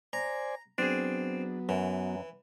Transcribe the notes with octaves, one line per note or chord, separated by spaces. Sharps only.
C5 D5 G#5 A#5
F#3 B3 C4 D4 G#4
F#2 E3